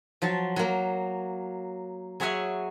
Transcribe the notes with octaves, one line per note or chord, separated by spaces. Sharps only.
F3 F#3 A5
F#3 A#3
F#3 G#4 C#5 E5 F#5 G#5